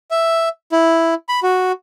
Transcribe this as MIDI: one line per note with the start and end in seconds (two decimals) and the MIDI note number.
0.11 0.49 76
0.72 1.14 64
1.29 1.40 83
1.43 1.72 66